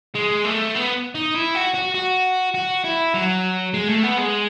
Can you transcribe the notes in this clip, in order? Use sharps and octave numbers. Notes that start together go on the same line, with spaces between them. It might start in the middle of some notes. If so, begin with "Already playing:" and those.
G#3
A3
B3
D#4
E4
F#4
F#4
F#4
F#4
E4
F#3
G#3
A3
B3
G#3